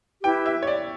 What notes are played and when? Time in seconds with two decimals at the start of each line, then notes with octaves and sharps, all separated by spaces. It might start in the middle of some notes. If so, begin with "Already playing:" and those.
0.23 E4 G4 B4 G5
0.46 E5
0.62 C#5
0.67 D5